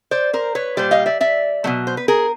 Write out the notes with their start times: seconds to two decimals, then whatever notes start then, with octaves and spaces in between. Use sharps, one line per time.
0.11 C5 D5
0.33 A#4 C5
0.55 B4 C#5
0.77 A#2 G3 C5 D5
0.91 D#5 F5
1.06 D5 E5
1.21 D5 E5
1.64 B2 F#3 A3
1.87 C5
1.97 B4
2.08 G#4 A#4